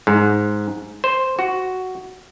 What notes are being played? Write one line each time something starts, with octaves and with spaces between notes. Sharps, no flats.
G#2
C5
F#4